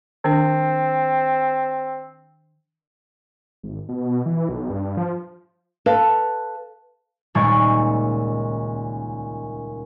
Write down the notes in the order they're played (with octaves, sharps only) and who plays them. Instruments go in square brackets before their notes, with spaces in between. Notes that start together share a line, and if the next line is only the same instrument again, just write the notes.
[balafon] D#3 D4 [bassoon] C4
[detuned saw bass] G#1
B2
E3
B1
G2
F3
[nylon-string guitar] A4 B4 F5
[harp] D#1 C#2 A#2 G#3 D5 C#6